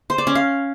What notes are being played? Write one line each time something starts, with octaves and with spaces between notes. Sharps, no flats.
C5
D5
C#4
F5